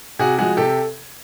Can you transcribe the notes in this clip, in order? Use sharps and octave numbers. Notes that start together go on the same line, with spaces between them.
C3 F#4 G#4
F3 G#3 F#4 G#4
C3 G4 A4